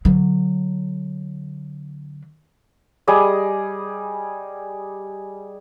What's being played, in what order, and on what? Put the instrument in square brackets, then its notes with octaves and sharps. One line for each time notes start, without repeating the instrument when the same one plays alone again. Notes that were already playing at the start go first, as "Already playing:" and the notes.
[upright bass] D3 F#3
[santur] G3 G#4 D#5